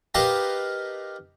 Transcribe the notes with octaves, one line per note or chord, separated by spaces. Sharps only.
D#4 G4 A#4 B4 F5 A5